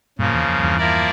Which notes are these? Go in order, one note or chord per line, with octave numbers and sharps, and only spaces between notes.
G2 A#2 C#3 F3 A#3
E2
F2
F2
E2 G2
F3 A#3 E4 A#4 D5